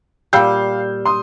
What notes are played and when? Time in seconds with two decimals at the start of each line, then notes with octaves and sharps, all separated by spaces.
0.33 A#2 G3 F5 E6 G6
1.05 C6 D#6